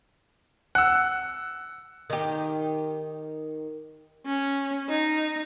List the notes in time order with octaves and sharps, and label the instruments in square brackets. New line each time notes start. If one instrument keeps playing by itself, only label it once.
[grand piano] F#5 E6
[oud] D#3 G4
[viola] C#4
D#4